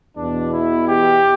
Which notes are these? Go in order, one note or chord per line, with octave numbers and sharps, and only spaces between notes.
E2 B2 D4
E4
G4